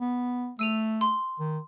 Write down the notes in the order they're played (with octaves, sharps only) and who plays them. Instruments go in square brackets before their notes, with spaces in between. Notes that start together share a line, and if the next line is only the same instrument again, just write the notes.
[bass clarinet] B3
[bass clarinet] A3 [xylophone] E6 D#7 F7
[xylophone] C6
[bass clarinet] D#3